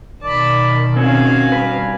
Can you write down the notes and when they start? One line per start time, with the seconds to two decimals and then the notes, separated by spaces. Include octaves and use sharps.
0.23 B2 D#3 D5 A5 B5
0.96 C4 C#4 F#4 F5 G#5
1.52 G2 B4